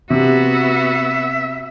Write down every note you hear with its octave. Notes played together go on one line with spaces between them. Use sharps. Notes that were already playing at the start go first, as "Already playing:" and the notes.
C3 B3 F#4 E5